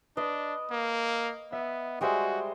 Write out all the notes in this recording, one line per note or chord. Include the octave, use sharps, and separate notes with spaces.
D4 B4 D#5
A#3
B3 E5
G3 G#3 F#4 G#4 C5 E5 G#5